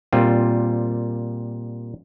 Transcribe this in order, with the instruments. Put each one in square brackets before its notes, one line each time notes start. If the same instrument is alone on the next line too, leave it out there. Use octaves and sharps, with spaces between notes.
[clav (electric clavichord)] A#2 G3 C4 F4